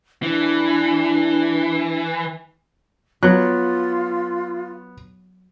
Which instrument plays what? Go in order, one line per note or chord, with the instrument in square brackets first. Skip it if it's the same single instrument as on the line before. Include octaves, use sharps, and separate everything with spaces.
[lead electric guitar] E3 [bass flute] D4
[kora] F#3 [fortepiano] B3 F#6 [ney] F4